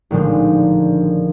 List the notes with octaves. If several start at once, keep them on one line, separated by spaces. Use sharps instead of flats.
A#1 A2 D3 D#3 F3 G#3